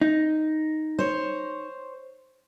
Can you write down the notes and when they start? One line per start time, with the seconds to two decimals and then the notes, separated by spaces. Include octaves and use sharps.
0.01 D#4
0.99 C5 C#5